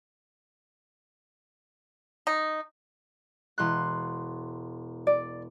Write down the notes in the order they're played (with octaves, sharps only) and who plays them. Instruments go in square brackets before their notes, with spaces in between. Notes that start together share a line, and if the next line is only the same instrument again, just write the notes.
[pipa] D#4
[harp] E1 C6 F#6
[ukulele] D5